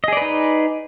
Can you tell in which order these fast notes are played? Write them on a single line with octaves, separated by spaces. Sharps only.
D#5 G#4 D5 B4 D#4